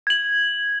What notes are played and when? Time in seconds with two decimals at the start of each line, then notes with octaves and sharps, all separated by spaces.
0.07 G#6 F#7